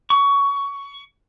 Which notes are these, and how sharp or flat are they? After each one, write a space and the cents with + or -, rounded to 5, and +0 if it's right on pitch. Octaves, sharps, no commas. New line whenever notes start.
C#6 +15